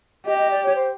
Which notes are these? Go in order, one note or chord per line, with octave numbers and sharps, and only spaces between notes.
G4 D#5
D#5
D5
C#5
C5